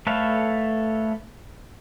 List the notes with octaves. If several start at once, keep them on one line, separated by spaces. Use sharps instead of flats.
A3 A4 B4 C#5 F5